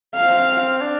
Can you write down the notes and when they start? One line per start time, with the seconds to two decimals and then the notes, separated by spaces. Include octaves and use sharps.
0.15 C4 F5
0.81 D4